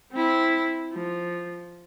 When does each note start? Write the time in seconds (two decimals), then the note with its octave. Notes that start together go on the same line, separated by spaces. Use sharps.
0.13 C4 E4
0.92 F3